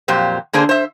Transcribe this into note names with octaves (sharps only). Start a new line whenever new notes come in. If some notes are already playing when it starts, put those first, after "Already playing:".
F2 A#2 F#3 G4 C5
D3 A#3 D4 G#4 C5
C5 E5